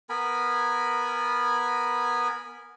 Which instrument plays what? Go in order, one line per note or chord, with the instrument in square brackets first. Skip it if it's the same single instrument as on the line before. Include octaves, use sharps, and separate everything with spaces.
[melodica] B3 A#4 G#5 B5